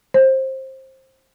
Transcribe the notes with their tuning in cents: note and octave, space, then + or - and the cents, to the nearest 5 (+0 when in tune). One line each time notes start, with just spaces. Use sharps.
C5 +20